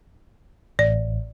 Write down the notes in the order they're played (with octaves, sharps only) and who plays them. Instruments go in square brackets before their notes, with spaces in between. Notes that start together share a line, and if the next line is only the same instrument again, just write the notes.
[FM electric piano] A1 [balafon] D5